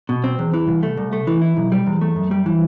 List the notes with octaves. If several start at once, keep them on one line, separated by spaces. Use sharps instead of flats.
B2
C4
E2
E3
C2
A3
C2
A3
E3
E4
B1
G3
E2
A3
F#2
G3
E3